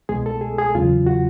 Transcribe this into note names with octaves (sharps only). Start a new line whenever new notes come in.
C2 B2 G#3 G#4
A4
G#4
G#4
E2 C#3 F#3 F4
F#4